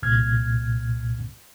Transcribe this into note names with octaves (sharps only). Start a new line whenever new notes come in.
C2 A#2 F6 G#6